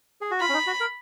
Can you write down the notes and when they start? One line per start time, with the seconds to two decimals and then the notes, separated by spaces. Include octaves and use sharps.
0.21 G#4
0.31 F#4
0.40 F4 B5
0.49 C#4
0.54 D#4
0.67 F#4
0.80 A#4